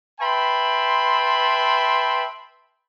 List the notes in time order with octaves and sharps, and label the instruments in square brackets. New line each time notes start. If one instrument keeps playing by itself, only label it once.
[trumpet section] B4 E5 G5 A5 B5 C6